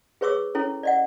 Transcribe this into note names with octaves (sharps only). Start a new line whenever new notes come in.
G#4 B4 C#5 C#6 D6 E6
C#4 E4 A4 C#5
D5 D#5 F#5